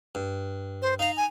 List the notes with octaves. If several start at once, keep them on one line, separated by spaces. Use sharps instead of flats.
G2
C5
D#4 F5 A#5
G#5